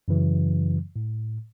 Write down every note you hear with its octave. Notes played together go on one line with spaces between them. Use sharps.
F#2 C#3 E3 F#3
A2